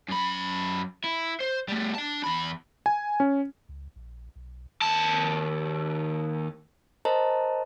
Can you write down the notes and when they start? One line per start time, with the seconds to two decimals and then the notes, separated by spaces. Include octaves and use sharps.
0.08 F#2 B5
1.04 E4
1.40 C5
1.68 G3 A3
1.95 D4 A5
2.24 E2 B5
2.86 G#5
3.20 C#4
3.69 C#2
3.96 A#1
4.36 B1
4.82 D#2 A5
7.05 A#4 C5 D#5 A5 A#5